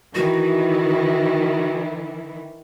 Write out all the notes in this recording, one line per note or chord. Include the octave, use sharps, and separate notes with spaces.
D#3 E3 E4 F#4